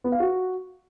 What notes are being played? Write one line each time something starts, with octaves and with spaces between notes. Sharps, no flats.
B3
F5
F#4